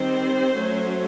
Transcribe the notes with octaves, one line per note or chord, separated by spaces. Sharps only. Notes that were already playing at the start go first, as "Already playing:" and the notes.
Already playing: D#3 G3 C4 C5
F#3 A3 C#4